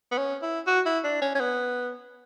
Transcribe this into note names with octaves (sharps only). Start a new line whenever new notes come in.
B3
C#4
E4
F#4
E4
D4
C#4
C#4
B3